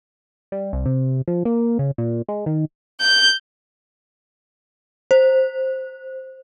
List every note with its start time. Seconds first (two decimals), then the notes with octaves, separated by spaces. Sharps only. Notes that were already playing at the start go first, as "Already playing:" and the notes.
0.52 G3
0.73 C2
0.86 C3
1.28 F3
1.45 A#3
1.79 C#3
1.98 A#2
2.28 G#3
2.46 D#3
3.00 G6
5.11 C5